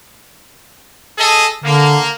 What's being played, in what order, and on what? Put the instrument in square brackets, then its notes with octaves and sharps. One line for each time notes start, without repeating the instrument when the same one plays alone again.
[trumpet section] G#4 A4 D#5
[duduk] D3 [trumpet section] A#3